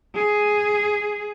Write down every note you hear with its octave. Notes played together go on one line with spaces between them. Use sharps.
G#4